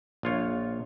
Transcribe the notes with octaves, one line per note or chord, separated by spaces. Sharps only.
A#1 F4 C#5